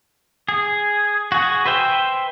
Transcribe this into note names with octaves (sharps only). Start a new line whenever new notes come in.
G#4
F#4 G#4
B4 C5 E5 G5